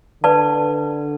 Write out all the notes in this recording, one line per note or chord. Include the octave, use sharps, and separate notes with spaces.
D3 B4 D5 A5